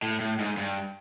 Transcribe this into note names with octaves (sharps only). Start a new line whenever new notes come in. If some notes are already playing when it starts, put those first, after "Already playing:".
A2
A2
G#2
G2